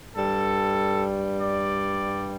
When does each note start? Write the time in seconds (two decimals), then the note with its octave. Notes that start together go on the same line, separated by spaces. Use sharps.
0.16 G2 G3 A4
1.41 D5